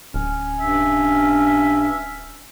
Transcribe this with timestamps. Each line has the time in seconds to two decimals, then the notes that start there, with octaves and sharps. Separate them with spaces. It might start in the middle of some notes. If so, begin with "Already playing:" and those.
0.14 D1 C#4
0.60 G2 E5